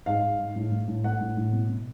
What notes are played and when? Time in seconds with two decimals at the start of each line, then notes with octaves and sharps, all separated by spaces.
0.06 G#2 F5
0.23 G#2
0.39 G#2
0.56 A2
0.72 A2
0.88 A2
1.04 A3 F#5
1.21 A2
1.37 A2
1.53 B2
1.69 B2